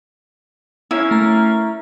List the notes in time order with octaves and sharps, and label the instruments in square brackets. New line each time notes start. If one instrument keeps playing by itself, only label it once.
[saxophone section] A#3 C#4 [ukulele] E4
[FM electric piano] A3 A#5